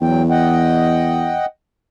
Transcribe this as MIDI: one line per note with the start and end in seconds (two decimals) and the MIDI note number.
0.01 1.39 40
0.01 0.23 54
0.01 0.23 79
0.30 1.45 75
0.30 1.45 78
0.30 1.45 79